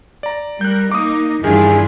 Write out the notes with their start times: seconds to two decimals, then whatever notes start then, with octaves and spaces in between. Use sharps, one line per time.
0.23 D5 A#5
0.61 G3 A#4 F#6 G6
0.92 A#3 D#4 D6 D#6
1.44 G2 D#3 E3 D4 E4 F4 G#4